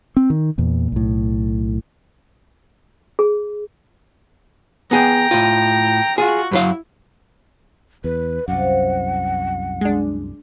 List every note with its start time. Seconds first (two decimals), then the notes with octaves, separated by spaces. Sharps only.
0.17 C4
0.30 D#3
0.58 E2 A#2
0.92 B1 A2
3.19 G#4
4.91 B3 G#4 G5 A#5
5.31 A2 F4
6.18 F4 F#4 G#4
6.51 F#2 F#3 E4 F5
8.04 E2 B4
8.48 C2 F#2 F4 C5 D5 F#5
9.81 G#3 D4 G#4